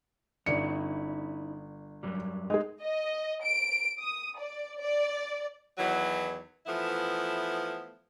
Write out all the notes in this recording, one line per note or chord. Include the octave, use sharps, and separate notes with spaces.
G1 C#4 D#4 E4 D5 C#7
F#2 F#3 G3
G#3 D#4 G#4
D#5
D7
D#6
D5
D5
E2 D#3 E3 F#3
E3 F3 A3 B3 E4